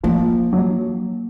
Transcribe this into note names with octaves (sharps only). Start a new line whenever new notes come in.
F3 A#3
F#3